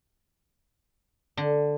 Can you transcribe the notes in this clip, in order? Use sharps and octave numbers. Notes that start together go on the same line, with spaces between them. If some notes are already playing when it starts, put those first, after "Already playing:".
D3